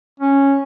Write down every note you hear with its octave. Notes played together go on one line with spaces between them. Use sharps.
C#4